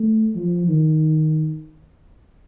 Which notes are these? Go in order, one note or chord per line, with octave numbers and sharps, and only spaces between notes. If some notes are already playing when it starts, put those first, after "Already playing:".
Already playing: A3
F3
D#3